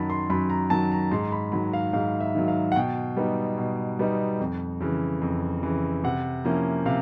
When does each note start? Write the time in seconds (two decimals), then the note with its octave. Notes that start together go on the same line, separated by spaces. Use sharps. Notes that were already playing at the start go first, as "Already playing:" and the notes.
Already playing: F#2 D#3 F#3 A5 B5
0.10 C6
0.30 F#2 B5
0.50 A#5
0.70 D#3 F#3 A5
0.92 A#5
1.11 G#2 C6
1.32 B5
1.52 D#3 F#3 B5
1.73 F5
1.93 G#2 F5
2.20 E5
2.35 D#3 F#3
2.48 F5
2.72 F#5
2.75 B2 G5
3.16 G3 B3 D#4
3.58 B2
3.99 G3 B3 D#4
4.40 F2
4.80 C#3 E3
5.22 F2
5.63 C#3 E3
6.04 C3 F#5
6.45 F3 A#3 C#4 E4
6.85 C3 F5